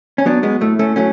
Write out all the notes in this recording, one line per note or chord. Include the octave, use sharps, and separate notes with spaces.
C#4
F#3 B3 D4
G#3 B3
A2 A3
A3 C#4
F#3 A3 C#4